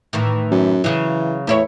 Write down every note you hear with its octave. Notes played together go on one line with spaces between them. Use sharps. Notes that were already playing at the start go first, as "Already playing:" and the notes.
A2 D#3 E3
F#2
C#3 E3 F#3
E2 A2 E4 C#5